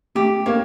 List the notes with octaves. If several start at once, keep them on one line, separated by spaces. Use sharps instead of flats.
A3 G4
A#3 C#5